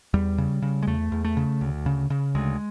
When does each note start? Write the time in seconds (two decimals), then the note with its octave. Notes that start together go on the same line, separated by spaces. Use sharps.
0.14 E2 G3
0.38 C#3
0.62 C#3
0.83 G#3
0.87 E2 A3
1.12 E2
1.25 A3
1.37 C#3
1.61 D2
1.86 C#3
2.10 C#3
2.35 D2 G#3